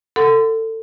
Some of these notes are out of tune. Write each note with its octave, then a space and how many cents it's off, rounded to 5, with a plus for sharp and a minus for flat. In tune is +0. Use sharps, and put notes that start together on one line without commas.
A4 +25 F#5 +0 C6 -35